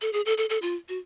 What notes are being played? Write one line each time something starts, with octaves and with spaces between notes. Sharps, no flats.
A4
G#4
A4
A4
A4
F4
F#4